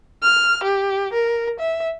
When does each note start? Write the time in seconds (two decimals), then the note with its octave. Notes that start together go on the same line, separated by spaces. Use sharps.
0.22 F6
0.64 G4
1.13 A#4
1.60 E5